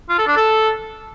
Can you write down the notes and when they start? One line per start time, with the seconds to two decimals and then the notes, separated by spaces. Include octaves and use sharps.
0.09 F4
0.18 A4
0.27 D4
0.36 A4